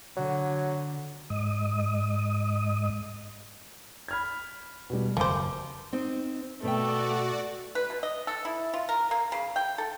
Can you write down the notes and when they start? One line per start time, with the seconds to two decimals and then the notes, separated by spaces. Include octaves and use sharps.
0.17 D3 F#3
1.30 G#2 D#5 D#6
4.08 B5 F6 G#6
4.90 B2 G3
5.17 F#1 F3 C5 D6
5.93 C4 D#4 C5
6.63 B2 A3 F#4 C5 D5 G5
7.75 B4
7.90 B2
8.03 D#5
8.27 A4
8.45 E4
8.74 F4
8.89 A#4
9.11 A#3
9.32 C#3
9.56 G5
9.78 A4